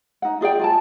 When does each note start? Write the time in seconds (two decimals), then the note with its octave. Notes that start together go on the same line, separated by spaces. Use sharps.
0.22 D#4 F#5
0.41 F4 G#4 D5 G5
0.59 F4 G#5 A5